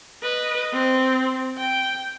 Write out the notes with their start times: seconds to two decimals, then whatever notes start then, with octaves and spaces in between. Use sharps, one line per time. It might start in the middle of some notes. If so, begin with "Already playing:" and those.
0.23 B4 D#5
0.72 C4
1.58 G5